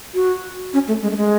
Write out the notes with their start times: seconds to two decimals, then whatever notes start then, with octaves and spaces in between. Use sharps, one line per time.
0.15 F#4
0.73 C#4
0.88 A3
1.02 G#3
1.12 A3
1.17 G#3